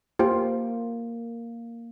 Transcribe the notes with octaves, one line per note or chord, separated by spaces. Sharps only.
A#3 F4 G4 C5 G5